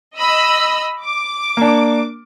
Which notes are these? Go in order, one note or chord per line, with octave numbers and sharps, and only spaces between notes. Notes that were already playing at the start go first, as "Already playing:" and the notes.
D#5 B5 E6
D6
A#3 D4